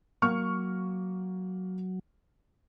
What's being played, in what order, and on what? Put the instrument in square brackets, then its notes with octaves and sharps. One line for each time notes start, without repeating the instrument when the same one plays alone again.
[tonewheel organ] F#3 [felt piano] A#3 C#6 F6